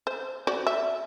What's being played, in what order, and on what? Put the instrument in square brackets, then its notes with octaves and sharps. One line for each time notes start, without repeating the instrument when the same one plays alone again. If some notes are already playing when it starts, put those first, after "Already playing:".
[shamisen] C5
F#4 C5 D5
E5